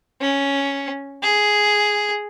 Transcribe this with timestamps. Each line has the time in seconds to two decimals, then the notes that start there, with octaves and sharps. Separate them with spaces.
0.21 C#4
1.22 G#4